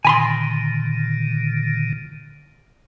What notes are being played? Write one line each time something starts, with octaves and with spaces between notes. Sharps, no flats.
A#2 D3 D#3 G#5 B5 C6